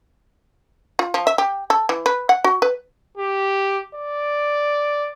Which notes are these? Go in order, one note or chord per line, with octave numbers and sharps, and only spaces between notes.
F4
F3
E5
G4
A4
E3
B4
F#5
F#4
B4
G4
D5